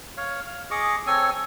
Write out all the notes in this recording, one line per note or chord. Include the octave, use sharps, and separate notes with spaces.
C#5 F5
F5
G#4 D#5 C#6 D6
C4 A4 C#5 G#5